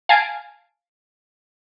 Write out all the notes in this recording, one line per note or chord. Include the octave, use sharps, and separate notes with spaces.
F5 G#5 A5 D7